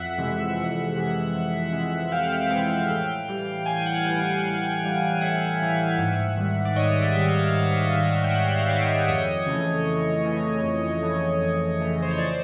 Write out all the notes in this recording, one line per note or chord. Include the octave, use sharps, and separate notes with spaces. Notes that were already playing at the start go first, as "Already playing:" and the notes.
Already playing: F2 E5 F#5
C3 E3 G#3
F2
C3 E3 G#3
F2
C3 E3 G#3
F2 F5 G5
C3 E3 G#3
A2
E3 G3
A2 G#5
G5
F#5
F5 G5
E3 G3
A2
E3 G3
A2 E5 F#5
E3 G3
G#2
D#3 G3
D5
G#2 C#5 D#5
D#5
D5 E5
D#3 G3
D#5 F5
G#2
D#3 G3
G5
G#2 E5 F#5
F5
D#3 G3 D5 E5
F2 C#5 D#5
C#3 E3 A3
F2
C#3 E3 A3
F2
C#3 E3 A3
F2
C#3 E3 A3
C5
C#5
C5 D5